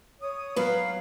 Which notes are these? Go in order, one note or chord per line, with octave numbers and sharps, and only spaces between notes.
C#5 D#6
F#3 B3 B4 F5